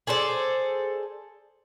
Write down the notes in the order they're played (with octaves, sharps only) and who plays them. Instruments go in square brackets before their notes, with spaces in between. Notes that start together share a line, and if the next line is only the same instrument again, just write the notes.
[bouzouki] G#4 A4 C5 D5